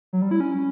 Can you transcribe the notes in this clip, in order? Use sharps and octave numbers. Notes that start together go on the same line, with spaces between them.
F#3
G3
E4
C#4